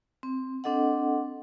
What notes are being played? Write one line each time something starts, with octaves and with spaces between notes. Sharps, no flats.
C4
C4 D4 A4 D#5 F#5